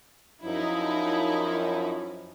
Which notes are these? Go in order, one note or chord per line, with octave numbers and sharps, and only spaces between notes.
F#2 F3 D#4 E4